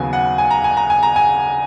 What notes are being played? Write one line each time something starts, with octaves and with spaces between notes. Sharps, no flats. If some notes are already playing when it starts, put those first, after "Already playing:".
Already playing: D#2 C#3 F#3 B3 G#5
F#5
G#5
A#5
G#5
A#5
G#5
A#5
G#5